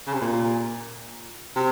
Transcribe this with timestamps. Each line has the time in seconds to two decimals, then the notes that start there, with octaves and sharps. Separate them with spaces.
0.07 C#3
0.13 C3
0.21 A#2
1.56 C3